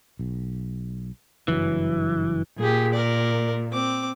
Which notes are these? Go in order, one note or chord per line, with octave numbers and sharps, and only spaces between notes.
B1
F#1 G2 E3 F#3
A#2 G4 G#4
A#4 D5
C4 D6